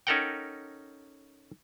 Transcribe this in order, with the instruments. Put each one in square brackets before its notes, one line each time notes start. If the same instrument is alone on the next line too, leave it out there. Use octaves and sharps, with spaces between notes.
[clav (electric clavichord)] C#4 D#4 A4 A#4 F#5 G5